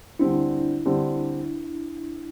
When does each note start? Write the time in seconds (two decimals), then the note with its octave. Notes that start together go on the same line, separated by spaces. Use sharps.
0.19 D3 G3 C4 D4 E4
0.85 D3 G3 C4